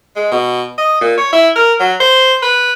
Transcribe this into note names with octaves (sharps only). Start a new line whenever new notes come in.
G#3
B2
D#5
A#2
C#5
E4
A#4
F#3
C5
B4